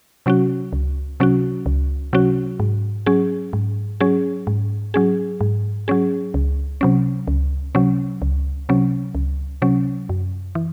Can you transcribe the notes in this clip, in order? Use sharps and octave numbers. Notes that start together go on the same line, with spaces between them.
C3 F#3 C#4 F#4
C#2
C3 F#3 C#4 F#4
C#2
C3 F#3 C#4 F#4
G#2
F#3 C#4 G#4
G#2
F#3 C#4 G#4
G#2
F#3 C#4 G#4
G#2
F#3 C#4 G#4
C#2
C3 F#3 C#4
C#2
C3 F#3 C#4
C#2
C3 F#3 C#4
C#2
C3 F#3 C#4
F#2
E3